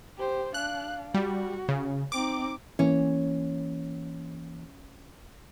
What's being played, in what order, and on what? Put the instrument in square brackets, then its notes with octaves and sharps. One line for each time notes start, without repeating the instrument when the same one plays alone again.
[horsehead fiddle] G4 C5
[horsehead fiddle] D4 F5 [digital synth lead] F#6
[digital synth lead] G3 [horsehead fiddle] F#4
[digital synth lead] C#3
[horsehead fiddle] C4 D#4 [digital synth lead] D6
[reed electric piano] E3 A#3 [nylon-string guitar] C#4